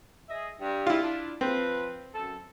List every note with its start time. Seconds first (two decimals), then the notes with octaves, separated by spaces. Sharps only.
0.29 G#4 D#5 E5
0.60 G2 G3
0.87 E4 F4
1.02 D4
1.41 F3 C4 B4
2.14 F#2 A4